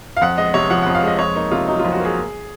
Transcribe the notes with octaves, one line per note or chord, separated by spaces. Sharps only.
F5
F2 F#5
G#3 D#5
C3 C#5
F3 F#5
F2 F#5
F5
G#3 D#5
F2 C#5
A#3 D#4
C3 F4
F#3 D#4
F2 F4
F#4
A#3 G#4